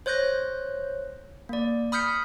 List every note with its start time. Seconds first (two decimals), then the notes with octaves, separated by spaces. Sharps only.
0.06 C5 C#5 F#6 G6 A#6
1.49 A#3 D5
1.92 B5 D#6 F6 G6 B6 C#7